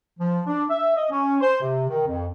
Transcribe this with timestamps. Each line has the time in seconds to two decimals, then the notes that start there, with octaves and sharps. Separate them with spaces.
0.19 F3
0.46 D4
0.69 E5
0.96 D#5
1.11 C#4
1.40 C5
1.61 C3
1.89 D#3
2.06 F2